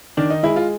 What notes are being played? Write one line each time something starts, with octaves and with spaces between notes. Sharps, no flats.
D#3 D4
D#4
G#3 E4
F4